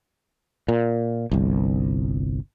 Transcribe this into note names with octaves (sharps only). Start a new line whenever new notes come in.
A#2
G1 C2